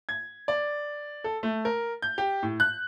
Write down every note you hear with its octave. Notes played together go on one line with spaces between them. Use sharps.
G#6
D5
A4
A3
A#4
G6
G4
A2
F#6